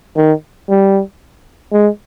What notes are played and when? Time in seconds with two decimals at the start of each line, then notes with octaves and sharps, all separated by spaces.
0.17 D#3
0.69 G3
1.73 G#3